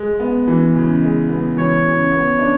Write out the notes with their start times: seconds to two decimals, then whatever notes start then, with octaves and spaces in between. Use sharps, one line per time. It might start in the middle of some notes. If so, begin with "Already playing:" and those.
Already playing: G#3
0.20 B3
0.48 E3
0.75 C#3
1.02 G#3
1.29 B3
1.57 E3 C#5
1.84 C#3
2.12 B3
2.39 D4